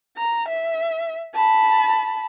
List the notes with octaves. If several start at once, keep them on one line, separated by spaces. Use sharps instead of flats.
A#5
E5
A5 B5